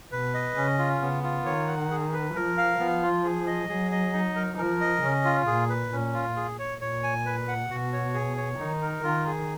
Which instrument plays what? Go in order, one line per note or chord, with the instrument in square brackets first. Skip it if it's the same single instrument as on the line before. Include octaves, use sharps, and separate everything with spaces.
[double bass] B2 [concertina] B4
[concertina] D#5
[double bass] C#3 [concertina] C#4
[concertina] F4
[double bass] C#3 [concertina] B3
[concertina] F4
[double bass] D#3 [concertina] C#5
[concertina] F#5
G#4
B4
[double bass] F3 [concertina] A#4
[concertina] F5
[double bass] F3 [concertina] B3
[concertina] F4
G#4
D#5
[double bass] F#3 [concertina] G#4
[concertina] D#5
D#4
A#4
[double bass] F3 [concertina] A#4
[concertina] D#5
[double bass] C#3 [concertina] C#4
[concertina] F4
[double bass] A#2 [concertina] G#4
[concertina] B4
[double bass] A#2 [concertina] C#4
[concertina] F4
G#4
C#5
[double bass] A#2 [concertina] C#5
[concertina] G#5
B4
F#5
[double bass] B2 [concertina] F#4
[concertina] C#5
G#4
C#5
[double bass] D#3 [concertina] D#4
[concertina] A#4
[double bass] D#3 [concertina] F4
[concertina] G#4